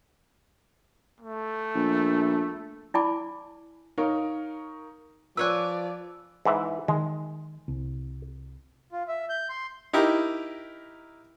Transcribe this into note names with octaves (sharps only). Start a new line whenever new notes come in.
A3
A#1
E4 D5 G#5 A5 B5 D6
D#4 A#4 C#5 F5
F3 B4 C#5 D5 G#5 E6 F#6
G#2 E3 E5
D#3 G#3
C2
F4
E5
G6
C6
D#4 E4 G4 A#4